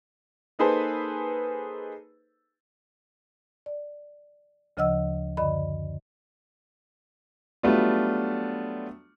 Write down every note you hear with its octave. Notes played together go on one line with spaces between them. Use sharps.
A#3 D#4 G#4 A4 B4 C5
D5
D2 C#3 F3 D#5 F#5 E6
F#2 D3 D5 D#5 B5
F#3 G3 A3 B3 D4 F4